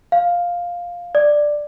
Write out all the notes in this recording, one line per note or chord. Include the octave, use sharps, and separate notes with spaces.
F5
D5